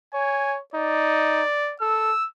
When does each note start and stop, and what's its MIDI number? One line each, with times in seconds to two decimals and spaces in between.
0.14 0.61 73
0.14 0.56 80
0.74 1.43 63
0.74 1.75 74
1.81 2.12 69
1.81 2.27 88